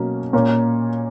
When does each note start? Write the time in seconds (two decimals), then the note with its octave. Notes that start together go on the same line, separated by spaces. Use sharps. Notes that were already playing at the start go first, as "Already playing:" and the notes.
Already playing: B2 F#3 A#3 C#4
0.33 A#2 A#3 C#4